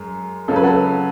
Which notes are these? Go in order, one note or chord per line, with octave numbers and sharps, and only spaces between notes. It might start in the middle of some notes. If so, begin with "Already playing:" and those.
Already playing: F#2 G#3
C#2 C#3 F#3 C#4 A4
B4
F#4 A4